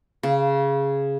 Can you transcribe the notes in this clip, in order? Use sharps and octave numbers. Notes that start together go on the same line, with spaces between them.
C#3